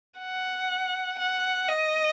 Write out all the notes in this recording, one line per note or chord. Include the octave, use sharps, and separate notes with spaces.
F#5
F#5
D#5